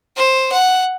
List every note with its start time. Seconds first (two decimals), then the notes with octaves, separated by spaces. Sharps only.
0.16 C5
0.52 F#5